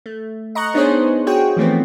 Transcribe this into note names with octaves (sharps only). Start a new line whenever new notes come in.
A3
D#5 A#5 C#6 F#6
B3 D4 D#4 G#4 C5 C#5
F#4 G#4 C#5 G5
E3 F3 A3 B3 C4